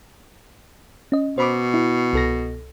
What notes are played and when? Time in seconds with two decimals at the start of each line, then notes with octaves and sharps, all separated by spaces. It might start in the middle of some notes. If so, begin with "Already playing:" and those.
1.12 C#4 D#5
1.38 B2 C5 B5 D6
1.74 E4
2.13 C2 A4 A#6